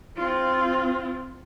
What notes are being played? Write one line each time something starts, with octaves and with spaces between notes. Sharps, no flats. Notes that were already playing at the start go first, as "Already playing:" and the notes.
C4 F4